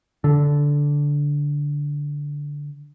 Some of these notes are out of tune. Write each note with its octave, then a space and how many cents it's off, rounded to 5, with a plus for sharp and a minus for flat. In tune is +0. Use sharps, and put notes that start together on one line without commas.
D3 -10